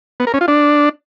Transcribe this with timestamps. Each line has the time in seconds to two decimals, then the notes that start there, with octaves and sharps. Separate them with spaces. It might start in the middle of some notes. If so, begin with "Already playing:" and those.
0.20 B3
0.27 A#4
0.34 C#4
0.41 F4
0.48 D4